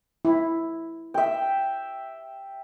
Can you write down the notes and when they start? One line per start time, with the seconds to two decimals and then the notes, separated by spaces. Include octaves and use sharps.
0.25 E4
1.14 E5 G5